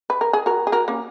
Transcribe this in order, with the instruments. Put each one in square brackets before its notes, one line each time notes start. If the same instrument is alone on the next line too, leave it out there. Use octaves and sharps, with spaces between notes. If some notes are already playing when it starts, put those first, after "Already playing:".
[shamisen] B4
A#4
G#4
F#4 A#4
G#4
F#4 A#4
A#3 C#4